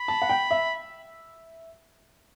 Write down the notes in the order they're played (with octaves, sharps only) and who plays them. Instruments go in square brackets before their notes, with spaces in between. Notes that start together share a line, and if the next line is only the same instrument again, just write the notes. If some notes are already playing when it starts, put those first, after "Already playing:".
Already playing: [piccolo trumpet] B5
[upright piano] A5
F#5
G5
E5